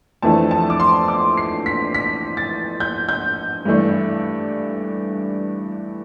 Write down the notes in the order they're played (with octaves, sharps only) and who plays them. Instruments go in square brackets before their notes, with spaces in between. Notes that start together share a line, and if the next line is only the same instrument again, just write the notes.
[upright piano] F2 E3 A3 D4 A5
A5
D6
C6
D6
C7
B6
B6
A6
G6
G6
G2 E3 A3 D4